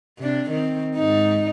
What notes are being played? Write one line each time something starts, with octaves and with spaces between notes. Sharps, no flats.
C3 D4
D#3 C4
G#2 D#4